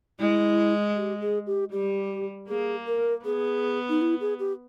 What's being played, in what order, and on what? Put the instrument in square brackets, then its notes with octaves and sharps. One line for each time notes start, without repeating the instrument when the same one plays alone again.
[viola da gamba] G#3 [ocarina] E4
[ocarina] G4
G#4
G4
[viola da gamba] G3 [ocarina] G4
[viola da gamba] A#3 [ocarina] G#4
[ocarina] A#4
[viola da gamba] B3 [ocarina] G#4
[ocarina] D#4
E4
G#4
G4